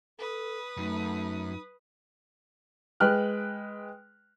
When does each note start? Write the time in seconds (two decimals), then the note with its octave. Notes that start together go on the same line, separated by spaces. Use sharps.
0.19 A4 B4 D#6
0.77 F#2 A3 D#4
3.00 G#3 B4 G5 F6 F#6